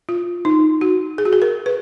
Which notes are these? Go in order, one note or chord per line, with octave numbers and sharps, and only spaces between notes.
F4
D#4
F#4
G#4
F#4
G#4
A#4
B4